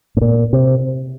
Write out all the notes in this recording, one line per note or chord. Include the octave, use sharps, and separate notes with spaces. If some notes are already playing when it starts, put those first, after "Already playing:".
A2
A#2
C3